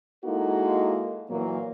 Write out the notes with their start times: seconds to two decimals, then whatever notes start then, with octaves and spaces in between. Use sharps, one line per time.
0.25 G#3 A#3 D#4 E4 F#4 A4
1.30 A#2 E3 F#3 A#3